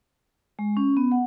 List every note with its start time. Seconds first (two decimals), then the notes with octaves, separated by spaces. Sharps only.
0.59 G#3
0.77 C#4
0.97 B3
1.12 F#5